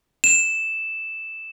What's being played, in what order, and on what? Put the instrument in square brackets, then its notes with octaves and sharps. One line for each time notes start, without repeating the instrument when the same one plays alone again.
[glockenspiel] E7